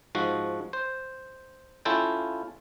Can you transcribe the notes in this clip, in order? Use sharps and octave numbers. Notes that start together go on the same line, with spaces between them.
G#2 F3 F#4
C5
C#4 E4 F4 A4 F5 G5